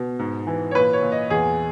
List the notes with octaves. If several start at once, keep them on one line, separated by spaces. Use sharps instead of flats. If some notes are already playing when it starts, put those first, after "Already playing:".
Already playing: B2
G#2
E3
C#5
A#2 B4
C#5
A#2
D#5
E2 G#4